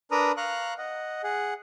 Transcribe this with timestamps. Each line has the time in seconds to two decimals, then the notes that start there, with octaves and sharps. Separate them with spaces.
0.11 D4 A#4 B4 A#5 D#6
0.37 F5 A#5 C#6 F#6
0.78 D#5 F#5
1.23 G#4 F#5